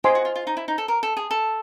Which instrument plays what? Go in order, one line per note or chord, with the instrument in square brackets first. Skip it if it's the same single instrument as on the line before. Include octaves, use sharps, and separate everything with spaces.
[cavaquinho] G4 [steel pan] C5 D#5 G#5 C6
[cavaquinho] F#4
F4
F4
D#4
E4
D#4
A4
A#4
A4
G#4
A4